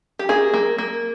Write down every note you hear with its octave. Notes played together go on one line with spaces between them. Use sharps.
G4
A#3 G#4
A#3
A#3